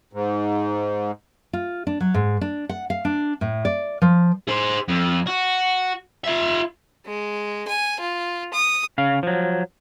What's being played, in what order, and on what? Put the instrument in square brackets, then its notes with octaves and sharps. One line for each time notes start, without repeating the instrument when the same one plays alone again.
[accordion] G#2
[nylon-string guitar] F4
D4
F#3
G#2
D4
F#5
F5
D4
A2
D5
F3
[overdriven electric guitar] G#4 C5
F2
F#4
F4 E5
[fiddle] G#3
G#5
F4
D#6
[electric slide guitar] C#3 F5
F3 F#3